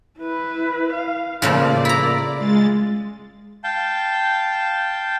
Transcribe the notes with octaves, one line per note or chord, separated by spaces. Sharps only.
E4 B4
F5
A2 C#3 F3 A#3 F4 D5
E4 A#5
G#3 F4 A6
F5 G5 A5 G6